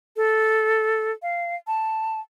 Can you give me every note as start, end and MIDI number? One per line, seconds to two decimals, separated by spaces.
0.16 1.11 69
1.22 1.56 77
1.67 2.20 81